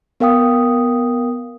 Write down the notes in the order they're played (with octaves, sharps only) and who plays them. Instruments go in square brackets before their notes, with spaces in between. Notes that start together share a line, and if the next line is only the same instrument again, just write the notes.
[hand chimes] B3 A#4 F5 G5 D#6